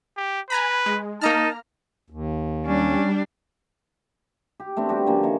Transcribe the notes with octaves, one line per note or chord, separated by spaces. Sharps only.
G4
B4 G#5 A#5 B5
G#3
A#3 D#4 A5 A#5 F6
D#2
G3 C#4 D4
G4
A3 B3 C4 D4
G3 F#4 G4
D3 F3 A#3 C#4
D#3 A3 C#5